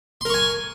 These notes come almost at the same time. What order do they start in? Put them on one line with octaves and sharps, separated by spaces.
C6 A#4 C#6 G#5